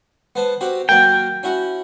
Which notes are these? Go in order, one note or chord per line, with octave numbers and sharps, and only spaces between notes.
B3 C5 A5
C4 F#4 G4
F#3 A#3 A#4 G5
C#4 E4 F#4